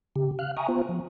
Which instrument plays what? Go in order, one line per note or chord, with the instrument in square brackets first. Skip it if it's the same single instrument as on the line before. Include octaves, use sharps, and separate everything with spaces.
[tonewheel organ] C#3 G4
F5 F6 F#6
E5 G5 G#5 A#5 C#6 D#6
B3 F4 C5
F3